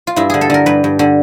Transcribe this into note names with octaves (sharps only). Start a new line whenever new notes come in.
F4
G2 E4
D3 G#4
A4
D3 A#4
G2 B4
G2
D3